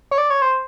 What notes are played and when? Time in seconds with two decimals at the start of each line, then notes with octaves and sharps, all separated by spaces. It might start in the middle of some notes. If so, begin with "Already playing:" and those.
0.11 C#5
0.18 D5
0.30 C#5
0.42 C5